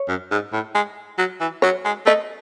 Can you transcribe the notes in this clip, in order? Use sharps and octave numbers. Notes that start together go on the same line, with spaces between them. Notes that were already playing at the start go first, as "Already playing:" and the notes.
Already playing: C#5
F#2
G#2
A2
G#3
F#3
E3
F#3 C#5
G#3
A3 D#5